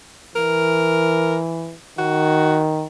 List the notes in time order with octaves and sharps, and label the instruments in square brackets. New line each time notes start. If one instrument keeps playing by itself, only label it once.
[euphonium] E3 [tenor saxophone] A#4
[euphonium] D#3 [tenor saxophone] F#4